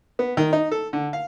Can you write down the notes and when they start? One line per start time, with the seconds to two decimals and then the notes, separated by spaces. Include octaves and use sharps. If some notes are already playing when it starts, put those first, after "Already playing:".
0.19 B3
0.37 D#3
0.53 D#4
0.71 A4
0.93 D3
1.13 F5